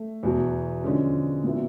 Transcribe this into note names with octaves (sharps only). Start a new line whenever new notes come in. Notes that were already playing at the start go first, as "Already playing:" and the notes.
Already playing: A3
E2 B2 F#3
D3 F3 G#3 C#4
A#2 F#3 B3 E4